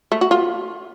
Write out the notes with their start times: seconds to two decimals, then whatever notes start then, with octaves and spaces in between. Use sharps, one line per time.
0.12 A3
0.21 F#4
0.31 F4